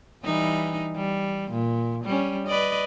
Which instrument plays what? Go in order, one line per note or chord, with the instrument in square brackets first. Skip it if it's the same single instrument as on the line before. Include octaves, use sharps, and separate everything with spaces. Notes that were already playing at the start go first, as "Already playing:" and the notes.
[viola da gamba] E3 G3 D#4
G3
A#2
G3 C#4
B4 D5 D#5